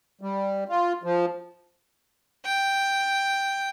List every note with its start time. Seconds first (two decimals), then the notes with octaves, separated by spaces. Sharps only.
0.21 G3
0.69 F4
1.03 F3
2.45 G5